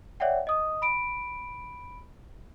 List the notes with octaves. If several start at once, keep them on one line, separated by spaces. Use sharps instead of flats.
C#5 D5 E5 F#5 G5
D#5 D#6
B5 D7